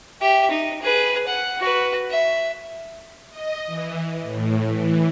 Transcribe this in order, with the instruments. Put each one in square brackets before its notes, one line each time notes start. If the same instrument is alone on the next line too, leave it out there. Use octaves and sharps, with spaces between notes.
[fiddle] G4 E5
D#4
G#4 B4
F#5
F#4 B4
E5
[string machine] D#5
E3
A2
E3